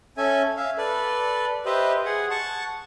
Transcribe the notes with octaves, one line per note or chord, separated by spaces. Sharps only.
C#4 A4 E5 G#5
E5 F5
A4 B4 D5
G4 B4 C5 D#5 E5
G#4 F#5
F#5 A5 C#6